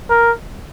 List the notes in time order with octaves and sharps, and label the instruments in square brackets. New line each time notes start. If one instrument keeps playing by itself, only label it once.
[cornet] A#4